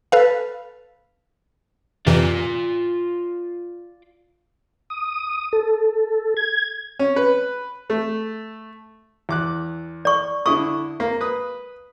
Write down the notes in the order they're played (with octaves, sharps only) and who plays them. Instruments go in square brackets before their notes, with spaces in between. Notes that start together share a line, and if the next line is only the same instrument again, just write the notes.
[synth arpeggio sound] A4 B4 F5
[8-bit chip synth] F2 C3 E3 [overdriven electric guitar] F4 D5
[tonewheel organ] D#6
A4
G#6
[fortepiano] C#4
B4
A3
E2 D6 F#6
[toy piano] D5 C#6
[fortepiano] D3 E4 D#6 [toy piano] C#6
[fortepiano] A#3
B4 D#6